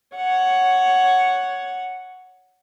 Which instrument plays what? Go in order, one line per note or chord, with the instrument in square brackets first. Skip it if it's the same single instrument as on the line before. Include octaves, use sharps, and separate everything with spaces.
[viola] C#5 F#5